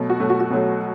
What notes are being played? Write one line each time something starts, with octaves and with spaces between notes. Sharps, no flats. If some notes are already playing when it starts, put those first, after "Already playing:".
Already playing: B2 F#3 A3
F#4
B2 F#3 A3
F#4
F#4
B2 F#3 A3